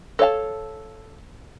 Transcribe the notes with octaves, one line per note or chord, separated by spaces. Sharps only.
A4 C#5 F5 A5